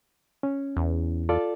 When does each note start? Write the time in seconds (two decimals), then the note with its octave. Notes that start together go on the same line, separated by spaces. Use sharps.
0.43 C#4
0.77 E2
1.29 F4 A4 D5